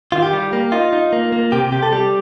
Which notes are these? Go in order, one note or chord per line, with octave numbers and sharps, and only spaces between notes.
D#3 F4
G4
G3
A#3
D#4 F4
D#4
A#3
A#3
C3 G4
C3 G4
A4
G3 G4